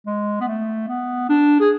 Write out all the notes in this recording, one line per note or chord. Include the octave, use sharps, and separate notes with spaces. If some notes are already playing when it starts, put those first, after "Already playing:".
G#3
B3
A3
B3
D4
G#4